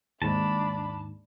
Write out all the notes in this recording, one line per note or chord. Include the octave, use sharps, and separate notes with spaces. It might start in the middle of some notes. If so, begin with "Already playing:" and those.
D#2 G#2 D4 A5 B5